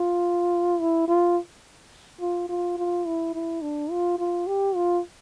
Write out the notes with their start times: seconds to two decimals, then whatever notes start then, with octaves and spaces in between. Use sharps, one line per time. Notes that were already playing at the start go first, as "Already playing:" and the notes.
Already playing: F4
0.81 E4
1.08 F4
2.21 F4
2.49 F4
2.78 F4
3.06 E4
3.34 E4
3.62 D4
3.91 F4
4.19 F4
4.47 G4
4.76 F4